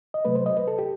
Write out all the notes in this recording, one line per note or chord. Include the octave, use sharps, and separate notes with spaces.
D#5
C3 F#3 A3 B4
C5
D#5
B4
A4
G4